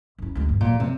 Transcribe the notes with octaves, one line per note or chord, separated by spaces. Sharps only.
F#2 E4
D2 G#3
G2
A#2 E3 F#3
C3